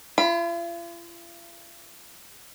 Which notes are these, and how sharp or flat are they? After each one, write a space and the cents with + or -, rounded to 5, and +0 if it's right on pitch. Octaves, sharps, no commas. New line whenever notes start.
F4 -45 B5 +0